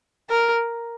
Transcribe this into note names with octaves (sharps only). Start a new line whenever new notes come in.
A#4